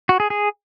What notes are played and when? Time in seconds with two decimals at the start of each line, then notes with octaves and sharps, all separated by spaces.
0.09 F#4
0.20 G#4
0.30 G#4